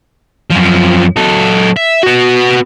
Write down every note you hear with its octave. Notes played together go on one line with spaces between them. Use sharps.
F#2 F3
F#3 A4
E5
B3 F#4